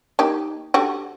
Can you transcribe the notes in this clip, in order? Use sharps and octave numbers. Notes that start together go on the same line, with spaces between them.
A#3 D#4 G4
D3 F#4 G4